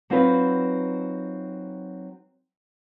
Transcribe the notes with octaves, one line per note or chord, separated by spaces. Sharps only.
F#3 C4 D#4 F4 B4